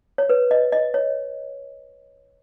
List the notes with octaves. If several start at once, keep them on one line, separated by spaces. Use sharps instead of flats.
C#5
B4
D#5
D#5
C#5